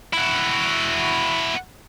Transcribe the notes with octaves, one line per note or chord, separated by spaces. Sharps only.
E4 F#4